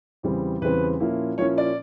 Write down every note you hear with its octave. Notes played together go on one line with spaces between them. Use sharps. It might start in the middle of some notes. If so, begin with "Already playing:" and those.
E2 C#3 E3 G3 C4
E2 C#3 E3 G3 C4 B4
A#2 F3 A#3 C#4 E4
A#2 F3 A#3 C#4 E4 C#5
D5